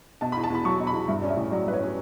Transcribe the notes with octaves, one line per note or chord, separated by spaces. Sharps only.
B2 A5
B5
E2
A5
E2 B5
F#3 C#6
B2
B5
E2
G2 E5
C#4 D5
E5
A1
F#3 D5
G2 B4
C#5
C#4